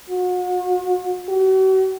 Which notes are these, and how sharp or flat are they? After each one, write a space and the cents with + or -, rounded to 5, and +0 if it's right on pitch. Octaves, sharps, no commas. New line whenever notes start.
F#4 -40
F#4 +40